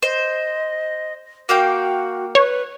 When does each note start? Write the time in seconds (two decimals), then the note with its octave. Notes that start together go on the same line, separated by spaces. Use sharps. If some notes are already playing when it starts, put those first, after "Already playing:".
0.02 C5 D#5
1.49 A#3 F#4 F5 G5
2.35 B4 C#5